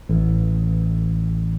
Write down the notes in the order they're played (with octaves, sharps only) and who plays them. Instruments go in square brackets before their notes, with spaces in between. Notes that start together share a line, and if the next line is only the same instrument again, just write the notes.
[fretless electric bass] A1